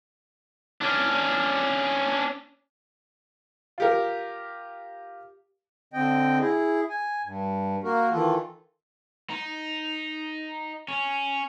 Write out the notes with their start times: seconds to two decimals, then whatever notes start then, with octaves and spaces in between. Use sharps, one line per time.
0.81 C#4 D4
3.78 F4 G4 A#4
5.94 D3 C4 D#5 G5
6.40 E4 G#4
6.89 G#5
7.24 G2
7.84 A#3 F#4 A#4
8.11 D#3 E3 F4 A4
9.30 D#4
10.88 C#4